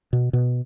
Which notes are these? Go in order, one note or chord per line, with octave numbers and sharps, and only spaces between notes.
B2
B2